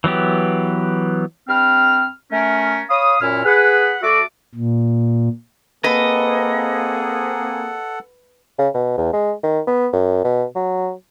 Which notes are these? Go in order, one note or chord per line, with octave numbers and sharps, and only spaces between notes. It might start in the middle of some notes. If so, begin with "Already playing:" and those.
E3 F#3 B3 G4
G2 C4 B5 F6
A3 C#4 A#4
C#5 F5 B5 D#6
F#2 A#2 C#4 E4 F6
G#4 B4 F#5
A3 F#4 A4 D5 E5 D6
A#2
A#3 C4 G#4 A4 B4 D#5 F#5
C#3
B2
E2
G#3
D#3
B3
F#2
B2
F#3